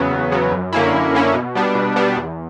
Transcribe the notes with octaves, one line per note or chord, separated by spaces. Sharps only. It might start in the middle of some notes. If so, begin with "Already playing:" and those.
Already playing: E2 C#3 F#3 B3
E2
C#3 F#3 B3
F#2
D3 A#3 C#4 E4
F#2
D3 A#3 C#4 E4
B2
G3 B3 D4
B2
G3 B3 D4
E2